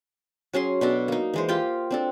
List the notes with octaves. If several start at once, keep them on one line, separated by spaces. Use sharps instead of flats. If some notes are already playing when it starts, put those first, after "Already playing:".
F#3 C#4 G#4 C6
B2 D4 A4
A#3 D#4
E3 G#3 C5
F4 G4 G5
C4 D4 A4